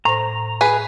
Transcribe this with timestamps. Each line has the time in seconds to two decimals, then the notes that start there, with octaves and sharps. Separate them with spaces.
0.05 A2 C5 A#5 A#6
0.61 G#4 B4